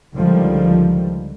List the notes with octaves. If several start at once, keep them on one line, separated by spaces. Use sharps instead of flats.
C#2 D3 D#3 F3 G3